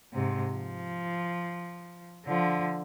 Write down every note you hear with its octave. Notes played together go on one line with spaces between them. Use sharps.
G#2 C3
F3
D3 F3